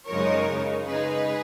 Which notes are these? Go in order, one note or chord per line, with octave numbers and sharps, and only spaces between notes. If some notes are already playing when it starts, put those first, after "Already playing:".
F#2 C#3 F3 G#3 D#4 A#4 C#5
C#3 G#3 D#4
C#3 G#3 D#4 G#4 B4